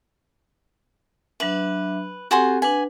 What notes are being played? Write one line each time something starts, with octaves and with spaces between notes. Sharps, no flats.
F#3 D4 B4 E5
C4 F#4 G4 A4 G#5 C6
D4 B4 F#5 G#5